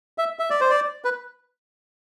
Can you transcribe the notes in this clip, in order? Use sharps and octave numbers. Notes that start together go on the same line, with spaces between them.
E5
E5
D5
C5
D5
B4